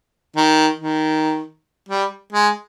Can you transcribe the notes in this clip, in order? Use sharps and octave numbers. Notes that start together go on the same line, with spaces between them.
D#3
D#3
G3
G#3